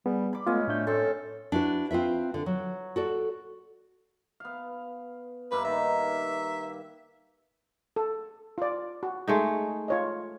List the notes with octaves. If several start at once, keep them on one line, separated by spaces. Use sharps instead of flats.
G3 B3 G#4
B5 D6
G#3 A3 B3 C#4 F4 D#5
A2 A3 D4 G6
F#2 C4 A4
D4 E4 F#4 B4
C4 F4 B4 E5
D3
F#3
F#4 A4 D5
B3 F5
G2 A#3 B4 E5
D#3 E5
A4
F4 D5
F#4
G#3 A3 D#4
F4 C#5 D#5